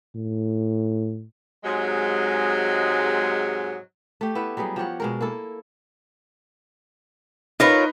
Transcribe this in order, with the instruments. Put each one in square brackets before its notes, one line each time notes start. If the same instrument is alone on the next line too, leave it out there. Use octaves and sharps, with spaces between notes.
[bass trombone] A2
[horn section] G#2 C3 F#3 G#3
[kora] A3 G4
B3 E4 B4
F#3 G3 B3 G#4
F3 G4 C#5 F#5
B2 G#3 A#4
A#3 E4 A4
[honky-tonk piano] D#4 B4 [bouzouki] F4 A#4 C#5